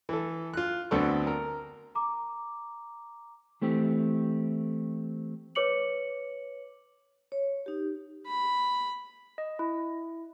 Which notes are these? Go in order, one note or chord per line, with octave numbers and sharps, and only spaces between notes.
E3 A4
F4 F#6
D2 B3 C4 D4 A4 C#6
A#4
A#5 D6
E3 A3 C4 G4
B4 C#5 D6 C#7 F#7
C#5
D#4 G4
B5
D#5
E4